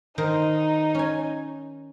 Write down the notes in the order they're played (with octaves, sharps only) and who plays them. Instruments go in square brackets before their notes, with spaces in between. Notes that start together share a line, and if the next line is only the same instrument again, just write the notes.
[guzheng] D#3 A#4 C5 [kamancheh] D#4
[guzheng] C#4 G#5